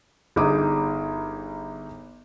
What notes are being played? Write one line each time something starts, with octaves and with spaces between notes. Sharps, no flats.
G1 D#4 G#4 D6 D#6